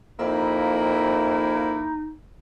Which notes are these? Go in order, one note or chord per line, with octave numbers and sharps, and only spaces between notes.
F2 A#3 D#4 E4